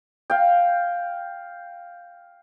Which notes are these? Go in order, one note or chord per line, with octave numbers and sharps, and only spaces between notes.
F5 G5